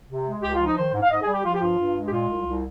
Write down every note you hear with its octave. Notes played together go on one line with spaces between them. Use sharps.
C3
G#3
C#2 G4
F4
F3
D#4
D#3 C5
G#2
F5
G#2 D#5
G#4
G3
G4
F3 F4
G4
G2 F4
G2
G#3
G4
A#2 F4
C2
C2